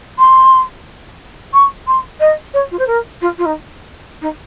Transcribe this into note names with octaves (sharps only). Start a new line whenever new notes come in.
C6
C#6
C6
D#5
C#5
F4
C5
A#4
F4
F4
D#4
D#4